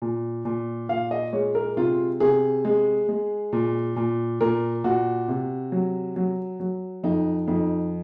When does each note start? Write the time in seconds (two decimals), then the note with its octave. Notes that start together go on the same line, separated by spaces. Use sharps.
0.02 A#2
0.45 A#2
0.89 A#2 F5
1.11 D#5
1.33 G#3 C#5
1.55 A#4
1.77 C3 F4
2.20 C3 G#4
2.65 G#3
3.09 G#3
3.53 A#2
3.96 A#2
4.41 A#2 A#4
4.84 A#2 F#4
5.28 C3
5.72 F#3
6.16 F#3
6.60 F#3
7.04 F2 D#4
7.47 F2 D#4